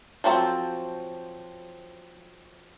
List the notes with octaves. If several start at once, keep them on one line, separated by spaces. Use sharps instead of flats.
F3 F#3 C4 A4